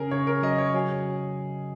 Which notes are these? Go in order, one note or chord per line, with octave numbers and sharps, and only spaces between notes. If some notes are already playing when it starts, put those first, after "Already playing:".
Already playing: C#3 C#4 G#4 A#4
C#3 C#5
A#4
F#3 D#5
C#5
F#3 G#4